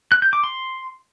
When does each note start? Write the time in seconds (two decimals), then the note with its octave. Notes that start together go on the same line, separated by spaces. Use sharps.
0.12 F#6
0.22 G6
0.33 D6
0.44 C6